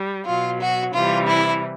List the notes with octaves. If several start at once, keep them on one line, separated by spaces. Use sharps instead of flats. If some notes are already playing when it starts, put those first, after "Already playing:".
Already playing: G3
B2 F#3 F4
F#4
C3 E3 G3 F4
E4